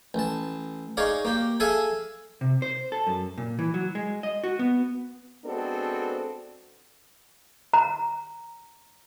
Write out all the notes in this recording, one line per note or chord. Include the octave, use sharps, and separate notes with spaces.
A1 A5
D#4 G#4 C#5 D5 F5
A#3 G4
G#4 A4 E5 F5 G#5 A5
C3
C5
A4
F#2
A#2
E3
F#3
G#3
D#5
F#4
B3
G#3 B3 C4 D4 F#4 A4
A#5